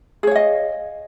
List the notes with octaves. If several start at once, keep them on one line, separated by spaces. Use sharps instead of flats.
G#4 C#5 D#5 F5